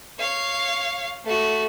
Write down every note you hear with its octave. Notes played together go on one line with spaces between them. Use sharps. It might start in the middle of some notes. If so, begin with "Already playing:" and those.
C#5 F5
A3 F#4